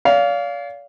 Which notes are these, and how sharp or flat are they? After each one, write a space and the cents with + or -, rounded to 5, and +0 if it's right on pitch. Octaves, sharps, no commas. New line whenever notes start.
D5 -45 F5 +0